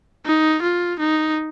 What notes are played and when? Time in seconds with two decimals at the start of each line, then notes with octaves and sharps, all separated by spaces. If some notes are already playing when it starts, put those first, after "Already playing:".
0.26 D#4
0.62 F4
0.99 D#4